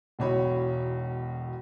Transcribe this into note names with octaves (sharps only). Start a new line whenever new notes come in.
E1 B1 C#5 B5